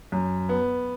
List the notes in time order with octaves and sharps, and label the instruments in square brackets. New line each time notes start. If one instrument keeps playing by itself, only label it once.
[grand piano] F#2
B3